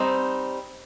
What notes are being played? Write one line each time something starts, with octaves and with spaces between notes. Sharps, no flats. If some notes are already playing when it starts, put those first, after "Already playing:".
Already playing: G3 C4 D#4